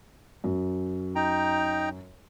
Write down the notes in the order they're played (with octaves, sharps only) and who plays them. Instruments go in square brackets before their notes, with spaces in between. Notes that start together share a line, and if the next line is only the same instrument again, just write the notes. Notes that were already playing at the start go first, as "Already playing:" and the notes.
[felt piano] F#2
[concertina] D#4 G5 A#5